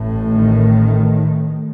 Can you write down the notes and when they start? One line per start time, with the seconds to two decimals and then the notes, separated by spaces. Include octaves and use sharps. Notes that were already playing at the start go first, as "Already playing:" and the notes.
Already playing: A1 A2
0.32 D#3